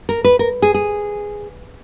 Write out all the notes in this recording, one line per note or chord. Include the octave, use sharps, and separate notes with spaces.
A#4
B4
A#4
G#4
G#4